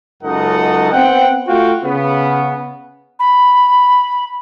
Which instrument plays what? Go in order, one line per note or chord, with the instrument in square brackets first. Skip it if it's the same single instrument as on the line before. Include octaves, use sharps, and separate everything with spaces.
[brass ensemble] C#2 F#2 D#4 A4 D#5 F#5
B3 C4 F#5 G5
A3 F4 F#4 F5 G5
C#3 B3
[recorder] B5